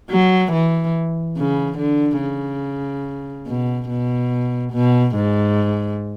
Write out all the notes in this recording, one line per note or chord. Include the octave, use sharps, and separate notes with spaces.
F#3
E3
C#3
D3
C#3
B2
B2
B2
G#2